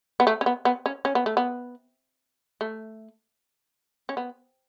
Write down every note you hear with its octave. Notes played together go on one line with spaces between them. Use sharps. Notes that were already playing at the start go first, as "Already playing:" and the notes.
B3
A3
C#4
B3
B3
C#4
C#4
B3
A3
B3
A3
C#4
B3